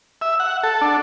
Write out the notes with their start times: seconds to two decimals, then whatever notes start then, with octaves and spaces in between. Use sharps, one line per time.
0.21 E5
0.40 F#5
0.63 A4
0.81 D4